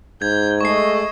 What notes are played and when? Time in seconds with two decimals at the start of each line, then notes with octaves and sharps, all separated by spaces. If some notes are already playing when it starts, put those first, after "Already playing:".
0.22 G#2 G6 G#6
0.61 G#3 A3 D#5 C#6 C7